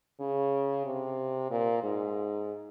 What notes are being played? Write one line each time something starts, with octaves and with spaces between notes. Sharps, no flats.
C#3
C3
A#2
G#2